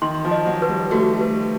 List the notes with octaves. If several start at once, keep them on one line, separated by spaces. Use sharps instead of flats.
D#3 C6
F3
D#5
F#3
B4
G3
A3 F#4
B4